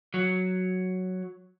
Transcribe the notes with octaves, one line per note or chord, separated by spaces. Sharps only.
F#3